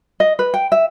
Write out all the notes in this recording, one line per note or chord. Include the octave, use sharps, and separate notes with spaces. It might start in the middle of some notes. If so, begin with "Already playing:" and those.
D#5
B4
G5
E5